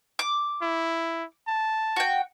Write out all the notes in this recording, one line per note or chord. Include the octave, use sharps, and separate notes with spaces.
D6
E4
A5
F#4 G5